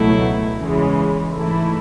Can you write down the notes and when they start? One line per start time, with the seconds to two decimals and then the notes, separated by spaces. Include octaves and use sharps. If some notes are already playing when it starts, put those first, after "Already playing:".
Already playing: C#2 B2 F#3 A3 E4
0.59 E2 C#3 E3 G#3
1.33 G#2 E3 A3 E4